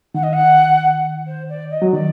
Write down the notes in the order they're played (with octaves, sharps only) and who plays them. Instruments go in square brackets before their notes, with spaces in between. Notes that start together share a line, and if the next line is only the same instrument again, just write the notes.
[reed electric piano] D#3 [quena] F#5
[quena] D#5
F#5
C5
D5
D#5
[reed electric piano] F#3
[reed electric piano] D#3 [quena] D5